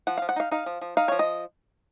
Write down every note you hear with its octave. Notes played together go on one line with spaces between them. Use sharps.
F3 F#5
F3 F5
F#5
D#4 F5
D#4 F5
F3
F3
D#4 F5
F3 C#5
D#5